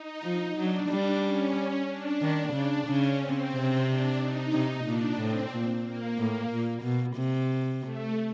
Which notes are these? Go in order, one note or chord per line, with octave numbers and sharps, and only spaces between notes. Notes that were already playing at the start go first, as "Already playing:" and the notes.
Already playing: D#4
F3
F#3 D4
G3 D4
C#4
D4
D#3
C#3 D4
C#3 C#4
C4
C3
D4
D#4
C3
A#2 D4
A2 C4
A#2
A#3
A2 A#3
A#2
B2
C3
A3